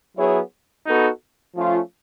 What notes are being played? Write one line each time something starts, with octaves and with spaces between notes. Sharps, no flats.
F#3 B3 E4 G#4 C#5
B3 D#4 F#4 A4
F3 A3 C#4 F4